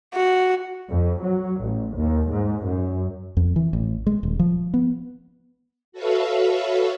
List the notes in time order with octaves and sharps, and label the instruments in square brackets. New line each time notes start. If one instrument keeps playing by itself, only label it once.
[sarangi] F#4
[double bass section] F2
F#3
A1
D#2
G#2
F#2
[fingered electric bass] F2
E3
A1
G#3
D#1
F3
B3
[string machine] F#4 A4 B4 C#5 E5 F5